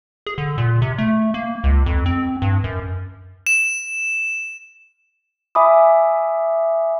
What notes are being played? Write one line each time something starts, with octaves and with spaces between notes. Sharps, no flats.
G#4
D3
A#2
C3
A3
A#3
C#2
F2
C4
G2
F#2
E7
E5 G#5 B5 D6 D#6